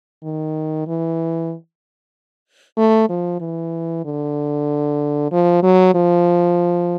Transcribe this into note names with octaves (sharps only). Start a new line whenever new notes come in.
D#3
E3
A3
F3
E3
D3
F3
F#3
F3